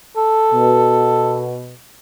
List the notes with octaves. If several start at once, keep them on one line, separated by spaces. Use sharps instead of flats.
A4
B2